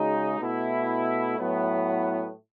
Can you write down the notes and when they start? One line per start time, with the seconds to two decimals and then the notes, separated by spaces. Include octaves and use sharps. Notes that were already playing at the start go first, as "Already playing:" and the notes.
Already playing: C#3 G#3 D#4 F#4
0.40 B2 A3 E4
1.36 A2 F#3 B3 E4